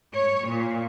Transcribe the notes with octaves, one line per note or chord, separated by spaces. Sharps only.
C#5
A#2